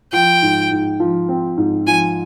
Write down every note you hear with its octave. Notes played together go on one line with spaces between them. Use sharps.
F3 G5
G#2
G#2
F3
C4
G#2
F3 G#5